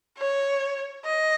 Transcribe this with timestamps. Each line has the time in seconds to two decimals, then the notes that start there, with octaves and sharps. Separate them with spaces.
0.18 C#5
1.05 D#5